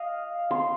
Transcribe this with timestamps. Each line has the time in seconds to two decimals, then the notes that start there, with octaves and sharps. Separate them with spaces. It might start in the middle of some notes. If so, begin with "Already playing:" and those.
Already playing: D#5 F5
0.51 C6